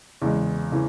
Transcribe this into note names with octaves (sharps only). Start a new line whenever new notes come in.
E2 C#3 E3 G#3
C#3 E3